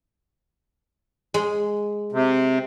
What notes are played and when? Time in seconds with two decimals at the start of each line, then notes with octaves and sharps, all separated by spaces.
1.34 G#3
2.12 C3